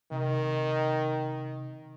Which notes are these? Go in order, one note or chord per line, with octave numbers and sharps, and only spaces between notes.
C3 D#3